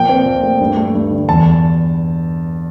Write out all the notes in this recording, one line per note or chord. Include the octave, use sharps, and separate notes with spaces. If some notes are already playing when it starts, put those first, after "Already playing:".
Already playing: A#2 F3 G5
C4
A#2
A3
G2
A3
G2
D3
E2 A5